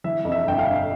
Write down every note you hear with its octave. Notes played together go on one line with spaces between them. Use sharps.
E3 E5
F2
E5
G1 G5
F5
G1